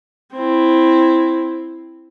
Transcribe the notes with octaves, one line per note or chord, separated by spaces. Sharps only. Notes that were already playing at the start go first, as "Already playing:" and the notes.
C4 E4